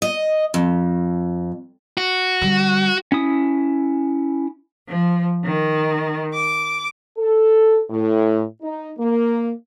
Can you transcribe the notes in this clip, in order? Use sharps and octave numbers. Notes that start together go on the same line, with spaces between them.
D#5
F2
F#4
D3 G3
C#4 E4 D#6
F3
D#3
D6
A4
A2
D#4
A#3